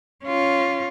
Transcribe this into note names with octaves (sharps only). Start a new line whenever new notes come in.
C#4 F4